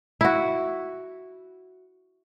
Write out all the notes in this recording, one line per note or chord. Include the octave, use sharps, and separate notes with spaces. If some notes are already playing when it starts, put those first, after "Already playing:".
E4 F#4